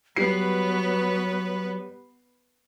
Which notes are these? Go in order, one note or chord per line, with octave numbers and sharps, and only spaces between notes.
F#3 G3 B3 B4 C7